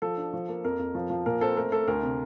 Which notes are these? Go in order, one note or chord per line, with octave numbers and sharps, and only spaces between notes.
F3 A4
D4
F3
A#3
F2 A#4
F2
F3
F3
A#2 A#4
C4 A4
A3 A#4
A3 A4
D2 A#4
C3